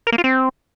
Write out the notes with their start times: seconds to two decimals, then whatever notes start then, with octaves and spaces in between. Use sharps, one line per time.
0.07 A#4
0.12 A#3
0.18 F4
0.24 C4